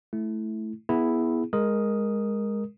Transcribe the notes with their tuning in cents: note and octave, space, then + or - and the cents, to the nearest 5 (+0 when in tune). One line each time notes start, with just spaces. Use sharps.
A3 -10 E4 +0
B3 -10 E4 +0 G#4 +0
G#3 -5 A#4 +5 D#6 +0